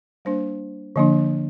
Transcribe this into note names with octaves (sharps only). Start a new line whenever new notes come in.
G3 A#3 D4 C5
D3 F3 A#3 D4